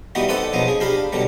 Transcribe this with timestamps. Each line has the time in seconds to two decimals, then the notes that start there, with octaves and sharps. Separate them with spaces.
0.15 E3 G3 B3 D#4 F#4
0.28 C4 D#4 A4 B4 D5 F#5
0.53 A#1 B2 F3 F#3 D#5
0.68 G#4
0.80 D4 G4 F5 A#5 B5
1.12 B2 D3 F#3 G3